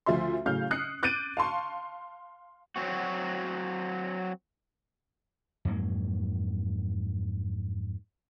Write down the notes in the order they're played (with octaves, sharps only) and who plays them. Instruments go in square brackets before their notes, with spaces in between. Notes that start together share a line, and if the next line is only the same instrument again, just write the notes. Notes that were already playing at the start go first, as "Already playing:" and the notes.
[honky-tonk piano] D2 F3 F4 E5 C6
A2 C#3 F#3 F5 F6 G6
D#6 F#6 C7 C#7
D6 F#6 G6 A6 D7 D#7
F5 A5 C6 C#6
[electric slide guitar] F#3 C4 F#4
[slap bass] F2 G#2 F#3 A#3